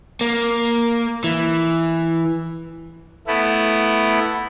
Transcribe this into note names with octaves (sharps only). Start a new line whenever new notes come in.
A#3
E3
A3 B3 E4